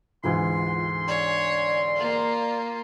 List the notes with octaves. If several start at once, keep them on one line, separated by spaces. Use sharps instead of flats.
D2 G#2 E3 F4 C6
C#5 D5
A#3 F4